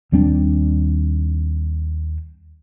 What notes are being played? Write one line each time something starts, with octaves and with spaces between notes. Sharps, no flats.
D#2 G3 C4 D4